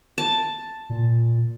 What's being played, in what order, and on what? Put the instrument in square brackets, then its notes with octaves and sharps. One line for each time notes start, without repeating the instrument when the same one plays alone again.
[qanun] A5
[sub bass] A#2